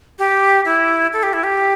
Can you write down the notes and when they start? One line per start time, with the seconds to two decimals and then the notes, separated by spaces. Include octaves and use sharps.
0.19 G4
0.65 E4
1.13 A4
1.23 G4
1.33 E4
1.44 G4